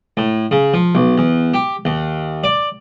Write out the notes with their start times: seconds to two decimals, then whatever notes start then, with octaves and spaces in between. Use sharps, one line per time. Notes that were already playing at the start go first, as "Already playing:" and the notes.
0.17 A2
0.51 C#3
0.74 F3
0.95 B1
1.18 E2
1.54 G4
1.85 D#2
2.44 D5